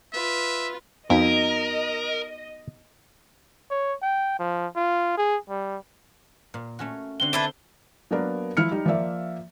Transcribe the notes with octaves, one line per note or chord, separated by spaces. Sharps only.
F4 B4 E5
F2 B3 D#4 F#4 A#4 D#5
C#5
G5
F3
F4
G#4
G3
A#2
A3 C#4 F#4
D3 C4 F#4 G7
D4 E4 B4 C5 E5
F#3 A#3 B3 D4 A#4
F3 E4 F6 C#7
G3 D#4
F3 A#3 D5 E5